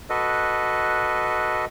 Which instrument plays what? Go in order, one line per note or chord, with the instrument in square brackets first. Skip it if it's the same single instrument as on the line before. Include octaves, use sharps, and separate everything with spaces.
[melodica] F#4 A4 B4 D#5